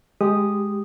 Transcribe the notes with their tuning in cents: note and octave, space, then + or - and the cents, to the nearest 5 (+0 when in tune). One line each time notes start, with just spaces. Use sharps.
G#3 +0 G4 +0 D#6 -5